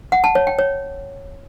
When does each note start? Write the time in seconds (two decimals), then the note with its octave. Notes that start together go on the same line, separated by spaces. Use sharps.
0.12 F#5
0.24 A5
0.35 C#5
0.47 G5
0.59 C#5